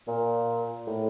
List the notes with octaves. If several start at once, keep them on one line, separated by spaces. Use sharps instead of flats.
A#2
A2